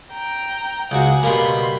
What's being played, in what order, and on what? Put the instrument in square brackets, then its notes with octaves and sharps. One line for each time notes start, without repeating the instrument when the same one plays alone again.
[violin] G5 A#5
[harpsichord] C#2 F#4 [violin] G#4 F#5
[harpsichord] B2 G3 A#3 [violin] B5 C6